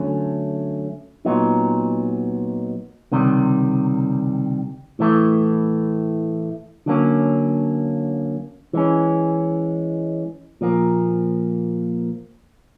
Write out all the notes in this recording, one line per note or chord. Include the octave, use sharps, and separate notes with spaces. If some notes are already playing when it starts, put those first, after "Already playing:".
Already playing: D3 F#3 A3 C#4
A#2 F#3 B3 D#4
C#2 C3 D#3 G3
A2 E3 A3
D3 F#3 A#3 C#4
E3 G#3 C#4
A#2 F3 A#3